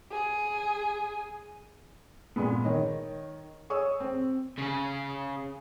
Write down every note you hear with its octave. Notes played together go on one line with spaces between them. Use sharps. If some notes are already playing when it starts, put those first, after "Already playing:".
G#4
A#2 G#3 B3
D#3 C#5 D#5
G#4 C#5 C#6 D#6 E6
C4
C#3 G#4